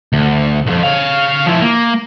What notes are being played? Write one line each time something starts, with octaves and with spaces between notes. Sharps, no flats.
D2
C2 F2
C#5 F5
F3 E4
A#3